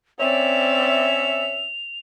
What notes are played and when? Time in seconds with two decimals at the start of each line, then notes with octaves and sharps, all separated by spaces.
0.19 C4 C#4 C#5 D5 E5 F7